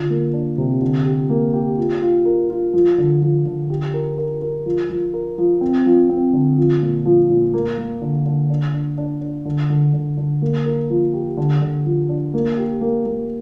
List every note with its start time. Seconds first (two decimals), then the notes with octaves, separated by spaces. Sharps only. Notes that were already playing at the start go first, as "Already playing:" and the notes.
Already playing: D3 F4
0.10 A#3
0.34 D4
0.58 C3
0.82 D3
1.06 G4
1.30 A#3
1.53 G4
1.78 F4
2.02 F4
2.25 A#4
2.50 F4
2.73 F3
2.98 D3
3.21 F3
3.45 D3
3.70 G4
3.94 A#4
4.18 A#4
4.42 A#4
4.66 F3
4.89 F3
5.14 A#4
5.38 F3
5.61 C4
5.86 F3
6.10 C4
6.33 D3
6.58 F3
6.82 A#2
7.06 F3
7.30 A#2
7.54 A#3
7.78 A#3
8.02 D3
8.26 D3
8.50 D4
8.74 D4
8.98 D4
9.22 D4
9.45 D3
9.70 D3
9.93 D3
10.17 D3
10.42 A#3
10.66 A#4
10.90 F3
11.14 G4
11.37 D3
11.62 D3
11.85 F3
12.09 D4
12.34 A#3
12.58 G4
12.81 A#3
13.06 A#3